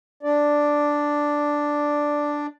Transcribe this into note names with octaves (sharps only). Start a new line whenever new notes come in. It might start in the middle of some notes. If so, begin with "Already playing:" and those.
D4 D5